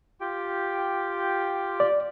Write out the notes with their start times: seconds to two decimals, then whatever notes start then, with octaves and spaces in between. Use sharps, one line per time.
0.21 F4 G4 G5
1.80 D5